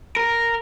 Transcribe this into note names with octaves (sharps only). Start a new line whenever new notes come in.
A#4